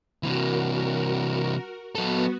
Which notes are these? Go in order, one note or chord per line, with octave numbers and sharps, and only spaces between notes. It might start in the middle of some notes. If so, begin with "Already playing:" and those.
C3 E3 F#4 A#4
F#3 B3 F#4 A4